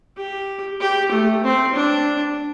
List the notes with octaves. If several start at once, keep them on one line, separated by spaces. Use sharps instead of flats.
G4
G4
A3
C4
D4